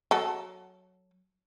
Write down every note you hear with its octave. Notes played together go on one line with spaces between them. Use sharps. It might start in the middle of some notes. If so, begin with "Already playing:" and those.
F#3 A4